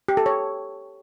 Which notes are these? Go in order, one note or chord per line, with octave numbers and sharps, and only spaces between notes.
G4
A4
C#5